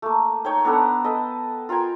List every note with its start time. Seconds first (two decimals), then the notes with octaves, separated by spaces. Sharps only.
0.02 A3 A#3
0.45 D#4 C#5 G5
0.64 B3 D4 A4 A#5
1.04 A4 B4 D#5
1.69 F4 A#4 G5 G#5